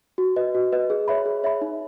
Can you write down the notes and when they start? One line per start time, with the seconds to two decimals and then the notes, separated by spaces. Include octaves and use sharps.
0.18 F#4
0.36 B4 D#5
0.55 F#4
0.72 B4 D#5
0.90 G#4
1.08 C#5 E5 B5
1.25 G#4
1.44 C#5 E5 B5
1.61 D#4